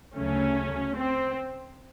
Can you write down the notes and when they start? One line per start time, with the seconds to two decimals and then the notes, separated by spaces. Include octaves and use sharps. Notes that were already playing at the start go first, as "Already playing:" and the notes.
0.16 D2 C#3 F#3 A3 C#4
0.96 C4